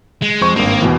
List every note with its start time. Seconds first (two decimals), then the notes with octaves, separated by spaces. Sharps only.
0.22 G#3
0.41 F2 C5 C#6
0.56 G#1 G2 A#3
0.82 E2 B2 E3